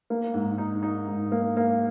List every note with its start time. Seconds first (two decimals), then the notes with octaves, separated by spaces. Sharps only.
0.10 A#3
0.34 G#2
0.58 D#4
0.83 D#4
1.08 G#2
1.32 A#3
1.57 A#3